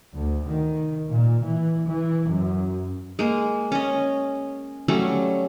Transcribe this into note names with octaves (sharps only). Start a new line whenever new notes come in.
D2
D#3
A#2
E3
E3
F#2
G#3 A#3
C#4 D#5
F#3 G3 A3 C#4